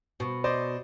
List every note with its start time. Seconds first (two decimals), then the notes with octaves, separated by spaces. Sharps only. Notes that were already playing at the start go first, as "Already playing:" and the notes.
0.20 B2
0.44 C5 D5 D#5